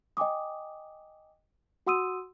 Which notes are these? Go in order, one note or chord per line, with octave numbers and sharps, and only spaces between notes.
D#5 G5 G#5 D6 D#6
F#4 F#5 C6 D#6 E6 D#7